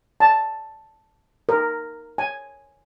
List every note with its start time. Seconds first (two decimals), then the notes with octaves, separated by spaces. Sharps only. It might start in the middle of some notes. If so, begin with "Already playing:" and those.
0.20 A5
1.49 A#4
2.18 G#5